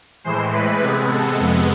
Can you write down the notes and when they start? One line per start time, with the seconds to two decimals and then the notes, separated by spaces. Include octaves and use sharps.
0.24 A2 E3 G#3 C5
0.52 B4
0.81 C3 G#3 B3
1.09 A4
1.38 F2 C3 G#3 B3